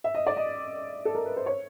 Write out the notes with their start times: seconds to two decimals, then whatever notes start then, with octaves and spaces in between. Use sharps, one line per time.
0.04 E5
0.15 D#5
0.27 D5
0.37 D#5
1.05 A4
1.15 A#4
1.25 B4
1.36 C5
1.46 C#5